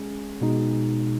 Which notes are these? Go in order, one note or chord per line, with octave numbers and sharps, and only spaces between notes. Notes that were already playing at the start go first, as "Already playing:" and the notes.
Already playing: G#3 C#4 G#4
B2 G#3 D#4